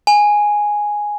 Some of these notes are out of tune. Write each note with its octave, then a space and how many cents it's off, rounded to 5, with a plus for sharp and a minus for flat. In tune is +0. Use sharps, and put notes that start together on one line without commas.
G#5 +0